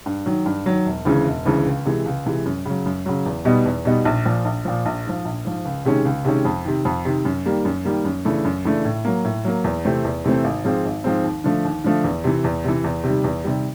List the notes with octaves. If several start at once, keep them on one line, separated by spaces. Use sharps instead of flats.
G2
D#3 F#3
G2
D#3 F#3
E1
D2 C#3 E3 G#3
E1
D2 C#3 E3 G#3
C#2
C3 E3 G#3
C#2
C3 E3 G#3
F#2
C#3 F#3
F#2
C#3 F#3
E2
B2 G3 B3 D#4
E2
B2 G3 B3 D#4
A#1
A#2 F3
A#1
A#2 F3
A#1
G#2 F3
A#1
G#2 F3
C#2
C3 D#3 G#3 C#4
C#2
C3 D#3 G#3 C#4
F2
C3 D#3
F2
C3 D#3
F#2
D#3 G3 A#3
F#2
D#3 G3 A#3
F#2
C#3 E3 A3 D4
F#2
C#3 E3 A3 D4
A2
F#3 A#3
A2
F#3 A#3
E2
C3 E3 A3 C4
E2
C3 E3 A3 C4
G#1
G#2 F3 G#3 C4
G#1
G#2 F3 G#3 C4
D#2
D3 F3 A3
D#2
D3 F3 A3
E2
C3 E3
E2
C3 E3
E2
C3 D#3 G3
E2
C3 D#3 G3